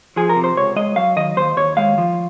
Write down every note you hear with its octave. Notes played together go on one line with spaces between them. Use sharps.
F3 G#4
A#4
C3
C5
C#2 C#5
G#3 D#5
F#3 F5
D#3 D#5
D#2 C5
D#2 C#5
G#3 F5
F3